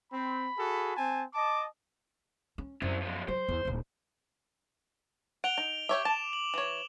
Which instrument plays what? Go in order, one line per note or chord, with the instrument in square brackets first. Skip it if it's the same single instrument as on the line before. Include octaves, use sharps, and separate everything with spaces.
[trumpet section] C4 [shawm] B5
[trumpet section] F#4 G#4 A4
C4 G#5 A5
[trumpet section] D#5 A5 [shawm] D6
[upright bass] C#4
[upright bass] F#2 [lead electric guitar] C4 E4
[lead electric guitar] F3 G#3
[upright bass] F#3 [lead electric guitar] C5
[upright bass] E2
D1 A#2
[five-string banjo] F#5 [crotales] D7 F7 G7
[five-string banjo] D#4
[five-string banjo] G4 C#5 E5 [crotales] D6
[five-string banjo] A5 [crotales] E7
[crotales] F#7
[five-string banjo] E3 C#5